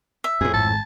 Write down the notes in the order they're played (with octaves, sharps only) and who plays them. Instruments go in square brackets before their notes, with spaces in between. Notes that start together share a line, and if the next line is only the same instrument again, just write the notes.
[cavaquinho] E5
[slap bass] F2 A2 [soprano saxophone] G#4
[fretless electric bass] G#1 G#2 [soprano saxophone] A5